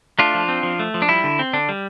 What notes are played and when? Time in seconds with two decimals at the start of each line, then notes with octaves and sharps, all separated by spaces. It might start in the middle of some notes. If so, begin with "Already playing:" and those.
0.19 A3 D4 F4
0.34 F3
0.48 C4
0.63 F3
0.79 A3
0.94 F3
1.02 D4
1.09 G3 E4
1.24 D3
1.39 C4
1.53 D3 D4
1.69 G3